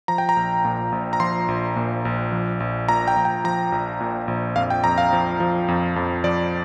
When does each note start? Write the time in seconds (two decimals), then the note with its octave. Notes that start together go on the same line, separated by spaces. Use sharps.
0.08 F3 A#5
0.18 G5
0.29 A#5
0.37 A#1
0.65 A#2
0.92 A#1
1.13 A#5
1.20 F3 C6
1.48 A#1
1.76 A#2
2.05 A#1
2.32 F3
2.60 A#1
2.88 A#2 A#5
3.08 G5
3.16 A#1
3.25 G5
3.44 F3 A#5
3.72 A#1
4.01 A#2
4.28 A#1
4.56 F2 F5
4.70 G5
4.84 F2 A#5
4.98 F5
5.13 F3
5.40 F3
5.68 F2
5.96 F2
6.24 F3 D5